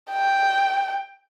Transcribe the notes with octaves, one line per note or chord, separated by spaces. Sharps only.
G5